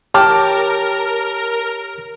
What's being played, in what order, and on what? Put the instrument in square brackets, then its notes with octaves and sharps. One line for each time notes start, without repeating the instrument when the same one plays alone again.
[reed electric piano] G4 C#5 [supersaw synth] A#4 [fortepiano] G5 D6 F6 [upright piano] A5